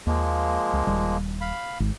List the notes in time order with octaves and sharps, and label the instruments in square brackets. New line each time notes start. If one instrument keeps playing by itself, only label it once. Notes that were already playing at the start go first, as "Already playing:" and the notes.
[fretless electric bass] D#2 [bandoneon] F3 G#3 A#3
[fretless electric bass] C#2
D#1 G3
[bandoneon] F5 B5
[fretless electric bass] G#1